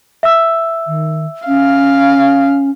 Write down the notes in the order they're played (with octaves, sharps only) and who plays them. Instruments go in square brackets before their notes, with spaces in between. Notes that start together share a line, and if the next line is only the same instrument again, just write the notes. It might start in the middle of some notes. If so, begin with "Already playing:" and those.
[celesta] E5 E6
[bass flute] D#3
[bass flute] C#4 [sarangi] F5